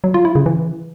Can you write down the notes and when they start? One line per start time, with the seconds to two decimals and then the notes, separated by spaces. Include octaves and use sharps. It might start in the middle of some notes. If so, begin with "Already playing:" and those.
0.04 F#3
0.14 F4
0.25 E4
0.35 C#3
0.46 E3